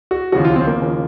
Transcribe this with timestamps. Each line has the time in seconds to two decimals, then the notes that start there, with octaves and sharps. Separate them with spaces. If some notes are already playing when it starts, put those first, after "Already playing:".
0.11 F#4
0.32 D#2 C#3 F3 F#4
0.45 F4
0.56 C4
0.67 A#3
0.78 D#2 C#3 F3